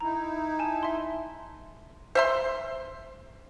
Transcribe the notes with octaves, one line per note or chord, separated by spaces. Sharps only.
D#4 E4 A#5
G#5 A5
E5 C6
C5 E5 C6